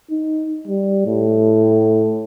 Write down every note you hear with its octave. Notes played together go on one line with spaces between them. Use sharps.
D#4
G3
A2